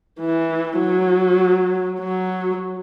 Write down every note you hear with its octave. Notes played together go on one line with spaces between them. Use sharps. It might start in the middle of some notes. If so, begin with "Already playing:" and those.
E3
F#3
F#3